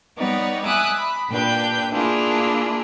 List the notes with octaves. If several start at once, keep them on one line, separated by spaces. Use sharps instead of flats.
G3 B3 D#4 C#5 D5
E5 G#5 D6 D#6 F#6
B5
A#2 D4 G4 B4 G5 G6
A#3 D4 E4 F4 G#4